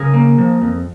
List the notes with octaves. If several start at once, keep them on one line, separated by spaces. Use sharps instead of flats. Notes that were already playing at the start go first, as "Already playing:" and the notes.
Already playing: C#3 G#4 A#4
A#3
F3
F2